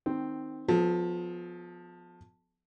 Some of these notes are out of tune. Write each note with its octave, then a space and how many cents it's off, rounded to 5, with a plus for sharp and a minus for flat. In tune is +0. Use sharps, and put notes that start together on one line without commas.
D#3 +0 C4 +0
F3 +20 B3 +15 A4 -40